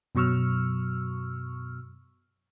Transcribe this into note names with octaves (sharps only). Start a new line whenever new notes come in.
F#2 B2 F#3 C#6 E6 F6